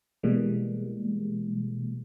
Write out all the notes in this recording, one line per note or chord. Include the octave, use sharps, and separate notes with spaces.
B2 E3 G3 G#3 A#3